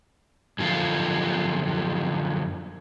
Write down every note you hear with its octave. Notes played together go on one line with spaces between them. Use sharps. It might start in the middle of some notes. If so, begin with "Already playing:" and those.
F#2 D3 F3 F4